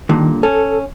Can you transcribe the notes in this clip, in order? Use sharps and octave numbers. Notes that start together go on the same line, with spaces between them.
G2 A#2 D3 D#3
C#4 A4